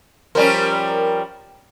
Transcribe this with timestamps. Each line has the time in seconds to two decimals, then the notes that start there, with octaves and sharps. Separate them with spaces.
0.35 F3 G3 C#4 A#4